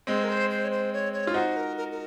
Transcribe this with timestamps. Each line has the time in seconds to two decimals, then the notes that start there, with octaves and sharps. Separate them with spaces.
0.07 G#3 C4 C5
0.24 A#4
0.29 C5
0.50 C5
0.65 C#5
0.71 C5
0.93 C#5
1.13 C#5
1.27 F4
1.34 D#4 F#4 C5
1.56 A#4
1.77 A#4
1.92 A#4